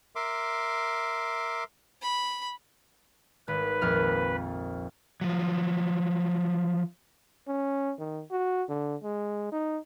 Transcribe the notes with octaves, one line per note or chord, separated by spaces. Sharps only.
A#4 E5 C6 D6
B5
G#1 B4
A#1 F2 F6
F3 F#3
C#4
D#3
F#4
D3
G#3
D#4